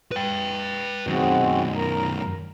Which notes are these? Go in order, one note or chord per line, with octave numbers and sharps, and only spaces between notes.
B4 G5
F#2 D#3 G#3 C4 F#4
A#4 A#5